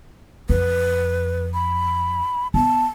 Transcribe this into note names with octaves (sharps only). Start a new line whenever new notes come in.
F2 B4
B5
B3 A5